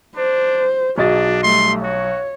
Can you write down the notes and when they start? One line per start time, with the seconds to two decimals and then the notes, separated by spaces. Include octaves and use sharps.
0.17 D4 C5
0.98 B1 D4 F#4 G#4 D#5 A6
1.43 G3 A3 C6
1.83 F#4 C#5